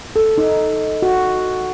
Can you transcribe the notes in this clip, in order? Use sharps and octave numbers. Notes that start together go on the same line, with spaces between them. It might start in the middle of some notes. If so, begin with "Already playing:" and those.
A4
D#4
F#4